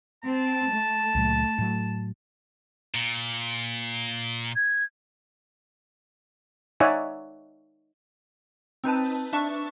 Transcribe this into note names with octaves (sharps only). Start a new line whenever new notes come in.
C4 A5
A3
C#2 A#2 F#3
A2 F#3
A#2
G#6
D#4 C#5 D5 E5 F#5 G#5
C4 D#4 B4 A5
D4 E5 A5 C#6